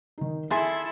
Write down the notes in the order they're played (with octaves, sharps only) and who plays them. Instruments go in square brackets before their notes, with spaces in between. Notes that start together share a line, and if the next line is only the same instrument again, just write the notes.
[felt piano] D#3 D#4
[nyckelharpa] E4 A4 [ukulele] G#4 [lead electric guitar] E5 [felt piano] C6 G#6 A6